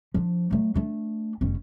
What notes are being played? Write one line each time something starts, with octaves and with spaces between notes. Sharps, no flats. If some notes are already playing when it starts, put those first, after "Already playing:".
F3 D4
F#3 A3
A3 D4
F1 C#4